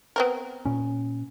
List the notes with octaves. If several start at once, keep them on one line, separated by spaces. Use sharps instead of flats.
B3 C4 A#4
A#2 C#4